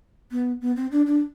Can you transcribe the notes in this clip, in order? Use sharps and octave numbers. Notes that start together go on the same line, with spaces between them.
B3
B3
C4
D4
D4